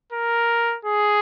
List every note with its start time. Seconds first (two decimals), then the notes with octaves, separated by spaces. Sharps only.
0.12 A#4
0.85 G#4